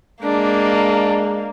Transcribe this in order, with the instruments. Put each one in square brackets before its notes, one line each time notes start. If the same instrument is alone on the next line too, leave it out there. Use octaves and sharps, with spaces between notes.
[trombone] G#3 [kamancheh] A#3 [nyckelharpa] D4